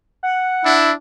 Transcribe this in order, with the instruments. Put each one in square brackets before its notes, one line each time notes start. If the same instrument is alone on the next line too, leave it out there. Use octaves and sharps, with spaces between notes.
[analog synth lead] F#5
[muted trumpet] D4 [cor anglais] E4